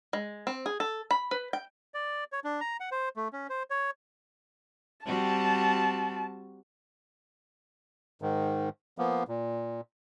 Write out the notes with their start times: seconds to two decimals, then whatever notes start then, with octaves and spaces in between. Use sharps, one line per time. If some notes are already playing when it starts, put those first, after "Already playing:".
0.13 G#3
0.47 C4
0.66 G#4
0.80 A4
1.11 B5
1.31 B4
1.53 G5
1.94 D5
2.32 C#5
2.44 D4
2.61 A#5
2.80 F#5
2.92 C5
3.16 A3
3.33 C#4
3.50 C5
3.70 C#5
5.06 G3 C4 F#4 A5
8.22 G#2 D#3
8.98 F3 A#3 B3
9.28 A#2